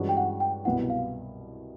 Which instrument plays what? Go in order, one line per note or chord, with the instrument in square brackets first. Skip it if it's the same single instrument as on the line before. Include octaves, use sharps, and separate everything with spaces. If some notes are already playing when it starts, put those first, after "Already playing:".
Already playing: [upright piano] G2 E3 G#3 C#4 F#4
[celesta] G5
F#5
G5
[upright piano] C2 B2 F#3 B3 E4 [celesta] F#5
[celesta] F5